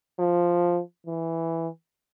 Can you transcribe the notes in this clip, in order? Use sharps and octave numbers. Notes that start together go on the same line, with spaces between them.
F3
E3